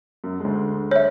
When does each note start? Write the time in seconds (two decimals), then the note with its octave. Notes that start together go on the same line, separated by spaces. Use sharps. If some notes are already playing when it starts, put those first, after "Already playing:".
0.24 F#2
0.40 D2 G#3
0.91 C#5 E5